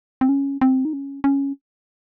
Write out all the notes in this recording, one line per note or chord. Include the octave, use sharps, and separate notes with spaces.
C4
C#4
C4
D#4
C#4
C#4